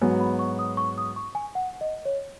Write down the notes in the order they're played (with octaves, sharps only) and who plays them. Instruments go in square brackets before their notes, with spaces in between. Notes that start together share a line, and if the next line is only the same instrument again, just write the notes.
[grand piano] G#2 F#3 B3 [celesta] G#5
[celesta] B5
C#6
D#6
C#6
D#6
C#6
G#5
F#5
D#5
C#5